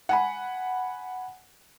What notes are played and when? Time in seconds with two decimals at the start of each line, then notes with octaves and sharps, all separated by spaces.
0.09 F#5 G#5 B5